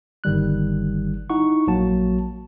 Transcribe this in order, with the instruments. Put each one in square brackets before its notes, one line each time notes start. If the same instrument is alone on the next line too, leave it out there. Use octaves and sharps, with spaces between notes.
[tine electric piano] G1 D#3 G3 F#6
D#4 E4 F#5 C#6
A#1 F#3 A#3 F#4 A5